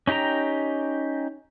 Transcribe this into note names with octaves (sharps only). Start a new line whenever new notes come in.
C#4 D#4 G4 G5 A#5